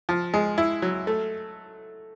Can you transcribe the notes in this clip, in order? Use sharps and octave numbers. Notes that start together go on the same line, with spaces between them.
F3
G#3
E4
F#3
A3